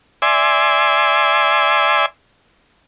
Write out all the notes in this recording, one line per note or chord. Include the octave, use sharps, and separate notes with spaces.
D5 E5 G#5 C6